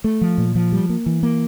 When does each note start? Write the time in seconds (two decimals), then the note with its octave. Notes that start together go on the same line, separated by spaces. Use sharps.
0.04 A3
0.21 F3
0.38 A#2
0.55 F3
0.72 G3
0.90 A#3
1.06 E3
1.23 A#3